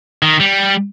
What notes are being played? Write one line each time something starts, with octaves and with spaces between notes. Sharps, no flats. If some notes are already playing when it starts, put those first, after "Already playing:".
D#3
G3